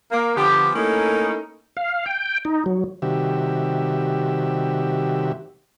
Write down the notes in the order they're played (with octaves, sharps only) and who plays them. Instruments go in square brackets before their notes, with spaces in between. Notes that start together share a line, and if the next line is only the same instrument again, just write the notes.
[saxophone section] A#3
D3 F3 B3 G4
A3 A#3 C#4 D#4 E4 A4
[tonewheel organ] F5
G5
D#4
F#3
[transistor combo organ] C3 D#3 G3 F#4 G4 E5